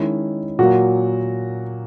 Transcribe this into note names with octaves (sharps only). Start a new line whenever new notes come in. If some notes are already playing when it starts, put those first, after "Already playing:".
Already playing: D#3 G#3 C#4 E4
A#2 F#3 A#3 F#4